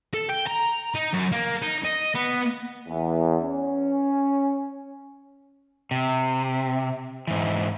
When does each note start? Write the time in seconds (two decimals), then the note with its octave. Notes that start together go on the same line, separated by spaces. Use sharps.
0.14 A4
0.29 G5
0.47 A#5
0.95 D#4
1.14 F#2
1.32 A#3
1.62 D#4
1.85 D#5
2.15 B3
2.88 E2
3.43 C#4
5.91 C3
7.27 G#2 E3